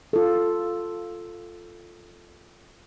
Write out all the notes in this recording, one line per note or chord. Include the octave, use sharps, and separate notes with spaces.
F4 A4